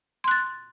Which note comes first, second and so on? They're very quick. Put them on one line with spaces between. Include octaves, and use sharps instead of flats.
C6 F#6 A6